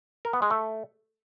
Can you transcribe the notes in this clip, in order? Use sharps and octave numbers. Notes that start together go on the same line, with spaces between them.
A#4
B3
G#3
A3